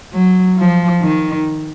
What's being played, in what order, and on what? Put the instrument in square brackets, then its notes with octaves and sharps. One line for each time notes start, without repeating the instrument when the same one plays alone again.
[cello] F#3
F3
D#3